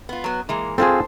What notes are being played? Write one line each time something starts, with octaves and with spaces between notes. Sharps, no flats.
B3 F4
F#3 B3
E3 G#3 A#3
C4 F4 G#4 A4 B4 C5